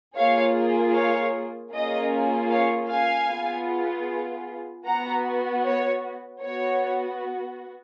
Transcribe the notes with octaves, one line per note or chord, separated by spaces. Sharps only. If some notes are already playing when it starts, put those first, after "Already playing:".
A#3 F4 G#4 C#5 F5
C#5 F5
A#3 C#4 F4 G#4 D#5
C#5 F5
F5 G#5
B3 F4 G#4
B3 F#4 F#5 A#5
C#5
B3 F#4 C#5